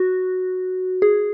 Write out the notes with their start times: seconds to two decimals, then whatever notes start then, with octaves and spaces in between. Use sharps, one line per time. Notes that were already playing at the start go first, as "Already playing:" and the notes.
Already playing: F#4
1.02 G#4